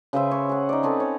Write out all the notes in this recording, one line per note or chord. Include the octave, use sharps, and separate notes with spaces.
C#3 B4 C5 E5
C#5
G#4 F#5
D#4 D5
C4 C#4 A4 B4
C#5